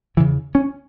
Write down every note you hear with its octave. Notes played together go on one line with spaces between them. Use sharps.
E2 C#3 E3
C#4